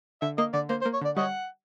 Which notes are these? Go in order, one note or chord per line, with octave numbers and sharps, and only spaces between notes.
D3 E5
A#3 D#5
D3 D5
A#3 C5
C5
A#3
C#5
D3 D5
G3 C#5 D#5 F#5